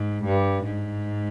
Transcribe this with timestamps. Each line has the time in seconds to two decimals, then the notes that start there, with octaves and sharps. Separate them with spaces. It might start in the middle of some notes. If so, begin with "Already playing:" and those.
Already playing: G#2
0.25 G2
0.64 G#2